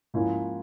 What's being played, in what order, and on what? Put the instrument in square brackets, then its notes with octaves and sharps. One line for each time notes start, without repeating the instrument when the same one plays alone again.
[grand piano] G#2 F3 A#3 C#4 E4